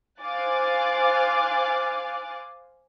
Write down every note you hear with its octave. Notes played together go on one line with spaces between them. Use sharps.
C5 F5 G#5 D6 F#6 A6